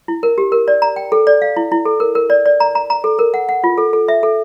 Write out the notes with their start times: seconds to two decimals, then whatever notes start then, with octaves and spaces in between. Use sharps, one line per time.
0.08 E4
0.23 A#4
0.38 G4
0.52 A#4
0.68 D5
0.82 A#5
0.96 G5
1.12 A4
1.27 D5
1.42 F5
1.57 E4
1.72 E4
1.85 A4
2.00 A#4
2.15 A#4
2.30 D5
2.46 D5
2.60 A#5
2.75 A#5
2.90 A#5
3.04 A4
3.19 A#4
3.34 F#5
3.49 F#5
3.64 F4
3.78 A4
3.93 A4
4.08 E5
4.23 A4